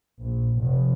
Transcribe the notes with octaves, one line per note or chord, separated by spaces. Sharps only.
A#1
F1